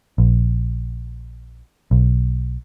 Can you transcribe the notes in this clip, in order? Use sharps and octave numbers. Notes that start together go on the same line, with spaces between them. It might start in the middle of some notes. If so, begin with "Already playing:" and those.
A#1
B1